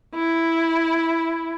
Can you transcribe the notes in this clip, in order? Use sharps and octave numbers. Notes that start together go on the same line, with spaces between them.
E4